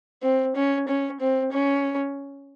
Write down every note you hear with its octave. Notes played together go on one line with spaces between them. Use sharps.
C4
C#4
C#4
C4
C#4